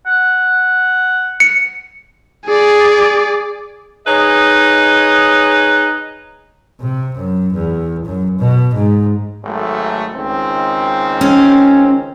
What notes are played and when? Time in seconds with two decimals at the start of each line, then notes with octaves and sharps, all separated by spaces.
0.06 F#5
1.40 C#7
2.45 G#4 D5
4.06 D#4 G#4 B4 C#5 D#5
6.80 C3
7.16 F#2
7.53 E2
8.06 F#2
8.39 B2
8.75 G#2
9.43 G#1 F#3 A3
10.14 C#2 D#3 C4
11.21 C#4